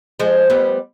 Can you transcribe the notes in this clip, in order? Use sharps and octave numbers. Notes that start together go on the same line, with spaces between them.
F3 G#3
G3 B3